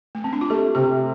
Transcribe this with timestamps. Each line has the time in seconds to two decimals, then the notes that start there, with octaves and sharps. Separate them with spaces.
0.15 A3
0.24 C4
0.33 D4
0.41 F4
0.50 A3 G4
0.75 C3 G4